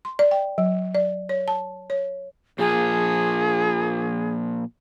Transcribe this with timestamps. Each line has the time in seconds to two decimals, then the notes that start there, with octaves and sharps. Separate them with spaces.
0.05 C6
0.19 D5
0.31 G5
0.58 F#3
0.95 D5
1.29 C#5
1.48 A5
1.90 C#5
2.59 A#2 F3 G#4